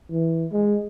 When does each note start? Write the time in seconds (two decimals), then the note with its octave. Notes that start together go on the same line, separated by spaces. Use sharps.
0.10 E3
0.52 G#3